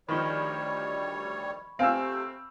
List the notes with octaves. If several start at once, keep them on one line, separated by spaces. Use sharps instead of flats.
D2 D#3 F3 G3 C#5 B5 C#6
C3 A3 C4 F5 G#5 E6